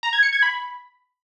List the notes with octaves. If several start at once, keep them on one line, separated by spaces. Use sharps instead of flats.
A#5
G#6
C#7
G#6
B5